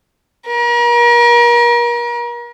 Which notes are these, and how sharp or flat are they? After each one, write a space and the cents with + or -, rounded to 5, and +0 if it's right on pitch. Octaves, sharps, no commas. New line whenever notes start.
A#4 +35